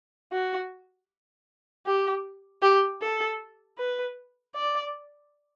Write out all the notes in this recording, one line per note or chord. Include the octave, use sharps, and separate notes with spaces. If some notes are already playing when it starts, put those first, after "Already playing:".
F#4
G4
G4
A4
B4
D5